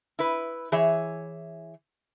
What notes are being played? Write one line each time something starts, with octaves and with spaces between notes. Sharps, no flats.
E4 B4
E3 G#4 C#5 E5